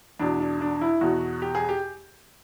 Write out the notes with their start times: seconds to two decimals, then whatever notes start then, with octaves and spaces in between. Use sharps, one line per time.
0.19 E2 B2 D4
0.40 D4
0.61 D4
0.81 E4
1.01 E2 B2 F#4
1.42 G4
1.55 G#4
1.69 G4